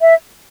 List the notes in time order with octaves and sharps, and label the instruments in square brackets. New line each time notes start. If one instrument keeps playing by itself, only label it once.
[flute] E5